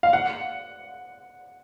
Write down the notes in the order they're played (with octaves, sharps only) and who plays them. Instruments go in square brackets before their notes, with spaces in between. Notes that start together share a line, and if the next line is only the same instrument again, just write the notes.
[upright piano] F5
F#5